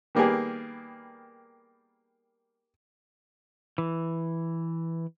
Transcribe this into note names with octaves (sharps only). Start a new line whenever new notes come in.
D#3 G3 A#3 B3 G4 G#4
E3